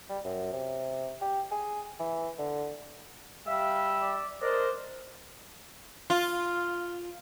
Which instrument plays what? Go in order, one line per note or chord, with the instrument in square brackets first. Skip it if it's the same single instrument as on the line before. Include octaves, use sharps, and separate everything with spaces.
[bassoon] G3
F#2
C3
G4
G#4
E3
D3
[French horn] G3 [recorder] E5 [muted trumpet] F5 [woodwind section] E6
[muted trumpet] D5
[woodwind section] D4 D#5 [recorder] A#4 [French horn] C5 [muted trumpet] D5
[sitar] F4